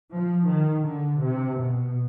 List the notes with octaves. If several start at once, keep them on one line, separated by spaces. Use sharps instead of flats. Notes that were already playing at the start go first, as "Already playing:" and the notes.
F3
D#3
D3
C3
B2